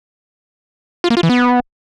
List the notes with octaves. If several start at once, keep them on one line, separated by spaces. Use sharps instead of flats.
F4
A#3
F4
E3
B3